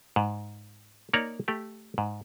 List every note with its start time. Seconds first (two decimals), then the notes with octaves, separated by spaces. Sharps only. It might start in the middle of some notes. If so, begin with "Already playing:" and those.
0.16 G#2
1.13 A#3 D#4 C#5 D5 A#5
1.48 A3 G4
1.98 G#2